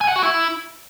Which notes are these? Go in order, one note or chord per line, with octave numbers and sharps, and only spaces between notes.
G#5
F#5
F#4
E4